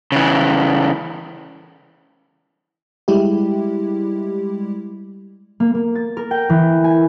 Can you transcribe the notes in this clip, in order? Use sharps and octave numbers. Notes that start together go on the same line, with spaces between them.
C#3 E3
G3 G#3 E4 G4
A#3
A#3
A6
A#4
G5
E3
G#5